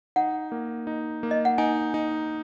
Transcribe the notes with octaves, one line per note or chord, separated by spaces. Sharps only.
D#4 F#5
A#3
D#4
A#3
D#5
F#5
D#4 G#5
D#4